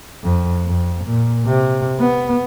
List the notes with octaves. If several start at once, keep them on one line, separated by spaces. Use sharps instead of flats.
F2
F2
A#2
C3
B3